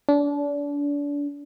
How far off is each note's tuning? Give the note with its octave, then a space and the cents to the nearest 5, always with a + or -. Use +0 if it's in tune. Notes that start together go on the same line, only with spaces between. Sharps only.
D4 -35